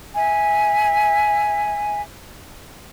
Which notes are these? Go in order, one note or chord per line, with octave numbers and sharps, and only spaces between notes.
E5 G#5